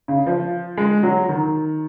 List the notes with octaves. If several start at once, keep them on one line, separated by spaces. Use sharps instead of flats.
C#3
F3
G#3
F#3
D#3